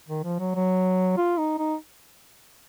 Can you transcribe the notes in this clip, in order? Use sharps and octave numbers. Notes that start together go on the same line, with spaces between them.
D#3
F3
F#3
F#3
F4
D#4
D#4